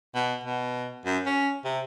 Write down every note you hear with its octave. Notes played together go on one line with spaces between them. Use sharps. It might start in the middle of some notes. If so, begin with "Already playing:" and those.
B2
B2
F#2
C#4
C3